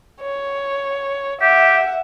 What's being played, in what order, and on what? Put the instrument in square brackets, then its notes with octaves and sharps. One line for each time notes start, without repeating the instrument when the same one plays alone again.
[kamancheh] C#5
[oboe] G4 [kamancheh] E5 F#5